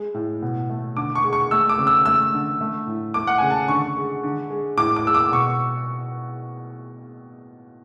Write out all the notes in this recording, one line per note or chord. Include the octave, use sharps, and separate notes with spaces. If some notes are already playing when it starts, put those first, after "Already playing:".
Already playing: G#3
A2
B2
A3
D3 D6
C#6
G#3
C#6
A3 E6
D6
C#3
E6
A3 E6
D3
A3
A2
A3 D6
F#5
C#3 G#5
A5
D3 C#6
G#3
D3
G#3
A2 D6
D6
G#3 E6
D6
B2 C#6